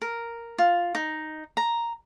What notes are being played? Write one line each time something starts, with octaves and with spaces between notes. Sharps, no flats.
A#4
F4
D#4
A#5